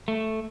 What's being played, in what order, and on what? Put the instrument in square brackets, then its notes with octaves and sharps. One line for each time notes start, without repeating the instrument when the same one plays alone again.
[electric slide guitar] A3